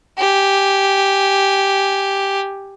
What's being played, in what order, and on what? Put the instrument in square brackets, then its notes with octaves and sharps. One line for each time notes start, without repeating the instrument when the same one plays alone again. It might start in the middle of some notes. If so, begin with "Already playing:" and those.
[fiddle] G4 G#5